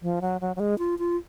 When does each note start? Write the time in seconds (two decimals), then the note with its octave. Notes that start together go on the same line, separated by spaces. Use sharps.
0.02 F3
0.22 F#3
0.41 F#3
0.56 F#3
0.60 G#3
0.78 F4
0.99 F4